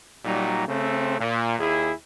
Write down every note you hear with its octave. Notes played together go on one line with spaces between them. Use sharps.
A#2 F#3 G3 D#4
C#3 A3 C4
A#2
D#2 E4 G#4